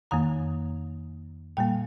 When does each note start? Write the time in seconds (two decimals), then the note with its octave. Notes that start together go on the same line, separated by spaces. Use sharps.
0.11 F2 D#3 A#3 A#5
1.57 A#2 G3 A#3 G5